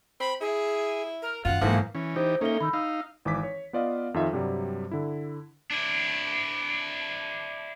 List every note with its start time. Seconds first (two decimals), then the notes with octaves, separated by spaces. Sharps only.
0.20 C4 B5
0.41 E4 G#4
1.22 A#4
1.45 F#2 D#3 F4 F#5
1.61 B1 G#2 E3 F3 A#3
1.95 E3 C#4
2.16 E3 D#4 G4 C5
2.41 A#3 C#4 D#4 A4 E5 G7
2.60 D#3 B5 E6 G6
2.73 D#4 F5 E6
3.25 G#1 E3 D6 B6
3.43 C#5
3.73 B3 F4 D5 D#5 F5
4.14 F2 D#3 D#4 F4 E5
4.33 G2 C3 F#3 G3
4.91 D3 E4
5.70 D4 E4